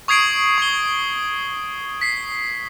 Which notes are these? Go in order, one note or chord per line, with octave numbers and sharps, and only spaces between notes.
C#6 D#6 G#6 C7 D7 F#7
C#6 C7 G7
B6 C7